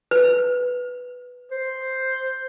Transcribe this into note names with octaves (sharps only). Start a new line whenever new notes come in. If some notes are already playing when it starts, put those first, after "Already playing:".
B4
C5